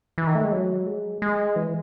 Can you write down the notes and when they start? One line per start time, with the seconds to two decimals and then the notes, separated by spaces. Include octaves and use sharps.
0.18 E3
0.27 D#3
0.35 A3
0.44 G#3
0.52 F#3
0.86 G#3
1.22 G#3
1.56 E3